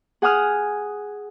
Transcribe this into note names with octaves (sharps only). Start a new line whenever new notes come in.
G#4 F#5 G#5 D#6 F6